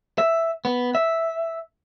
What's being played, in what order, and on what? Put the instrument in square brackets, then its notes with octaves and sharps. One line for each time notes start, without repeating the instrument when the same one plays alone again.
[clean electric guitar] E5
B3
E5